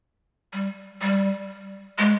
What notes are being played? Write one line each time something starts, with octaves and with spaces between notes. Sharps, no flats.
G3
G3
G#3